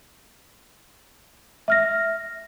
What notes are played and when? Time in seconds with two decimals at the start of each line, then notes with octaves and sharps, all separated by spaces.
1.68 E5 F6 A#6